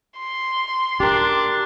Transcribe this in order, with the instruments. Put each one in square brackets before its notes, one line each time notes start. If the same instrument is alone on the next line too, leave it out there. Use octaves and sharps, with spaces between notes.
[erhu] C6
[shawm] D4 [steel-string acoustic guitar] G4 A#4